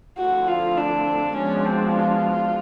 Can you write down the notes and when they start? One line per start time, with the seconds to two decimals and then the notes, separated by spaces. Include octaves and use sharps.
0.18 D3 F3 A3 C4 E4 F#4
0.48 F4
0.77 D4
1.36 F3 G#3 B3 C#4 D4 F#4
1.65 C4
1.95 F4